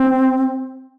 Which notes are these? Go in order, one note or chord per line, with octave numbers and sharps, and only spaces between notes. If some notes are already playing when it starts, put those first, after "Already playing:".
Already playing: C4